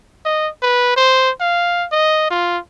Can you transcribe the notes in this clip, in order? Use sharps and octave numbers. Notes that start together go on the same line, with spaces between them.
D#5
B4
C5
F5
D#5
F4